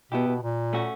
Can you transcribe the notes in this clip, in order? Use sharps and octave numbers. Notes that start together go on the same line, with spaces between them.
B2 B3 E4 G4
B2
A#2
A3 C#4 F#4